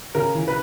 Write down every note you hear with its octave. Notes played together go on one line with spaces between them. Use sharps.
C#3 A#4
E3
B4